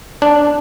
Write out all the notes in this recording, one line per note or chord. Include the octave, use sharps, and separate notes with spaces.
D4